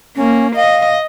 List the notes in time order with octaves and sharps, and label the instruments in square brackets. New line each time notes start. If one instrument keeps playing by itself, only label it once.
[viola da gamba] A#3 [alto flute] C#4
[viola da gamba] D#5 [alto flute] F5